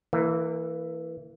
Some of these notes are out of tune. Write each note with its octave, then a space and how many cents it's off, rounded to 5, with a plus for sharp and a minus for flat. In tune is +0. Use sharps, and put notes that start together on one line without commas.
E3 +0 A#3 -30